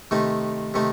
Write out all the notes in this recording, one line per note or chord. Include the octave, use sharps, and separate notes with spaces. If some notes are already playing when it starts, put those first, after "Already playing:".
C3 D#3 A3 D#4
C3 D#3 A3 D#4